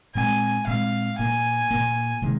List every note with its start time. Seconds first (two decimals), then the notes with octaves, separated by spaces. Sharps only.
0.15 A#2 G#3 C4 G#5
0.67 A#2 G#3 C4 F5
1.19 A#2 A#3 G#5
1.71 A#2 A#3
2.22 C3 D#3 G#3